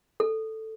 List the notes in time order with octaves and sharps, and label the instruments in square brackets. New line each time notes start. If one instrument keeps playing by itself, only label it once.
[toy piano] A4